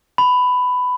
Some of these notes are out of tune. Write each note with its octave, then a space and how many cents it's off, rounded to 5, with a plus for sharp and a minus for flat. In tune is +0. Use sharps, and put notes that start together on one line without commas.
B5 +15